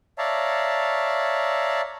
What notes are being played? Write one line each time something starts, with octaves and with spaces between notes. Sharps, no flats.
C#5 D5 E5 F5 A5 A#5